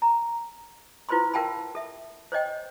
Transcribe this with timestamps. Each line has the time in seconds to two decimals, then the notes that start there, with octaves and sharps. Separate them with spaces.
0.02 A#5
1.09 E4 F4 B4 C5 B5 C6
1.34 A#4 F5 G5 A5 B5
1.75 A4 E5
2.32 C5 C#5 D#5 G5